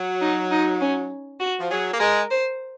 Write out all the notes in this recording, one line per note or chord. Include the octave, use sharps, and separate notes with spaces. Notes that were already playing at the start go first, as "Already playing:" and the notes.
Already playing: F#3
D#4
D#4
C#4
F#4
F3
F#3 G#4
A#3
G#3 A#4
C5